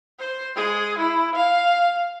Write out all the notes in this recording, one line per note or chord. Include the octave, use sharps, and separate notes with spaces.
C5
G#3 G#4
E4
F5